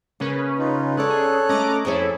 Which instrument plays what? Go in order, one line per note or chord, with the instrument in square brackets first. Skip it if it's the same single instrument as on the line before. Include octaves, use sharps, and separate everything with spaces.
[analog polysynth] C#3 C#4 B4 [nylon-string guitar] A#3
[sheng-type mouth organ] D#4 F4
[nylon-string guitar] C#4 D5 [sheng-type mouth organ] A4 C#5 F#6
[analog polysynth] G#4
[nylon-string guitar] A3 C#4 [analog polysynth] D#5 A#5 D6
[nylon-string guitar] F2 F#4 C#5 [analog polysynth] E4 G#4 A4